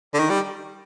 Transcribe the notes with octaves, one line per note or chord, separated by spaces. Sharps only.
D3
D#3
G3